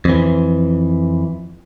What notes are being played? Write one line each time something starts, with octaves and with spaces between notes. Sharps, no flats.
F2 E3